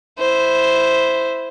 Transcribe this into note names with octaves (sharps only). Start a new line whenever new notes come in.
E4 C5